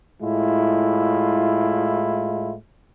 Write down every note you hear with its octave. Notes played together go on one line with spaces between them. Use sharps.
A2 G#3 E4 F4